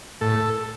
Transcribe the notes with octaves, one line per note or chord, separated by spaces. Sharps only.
A2 A4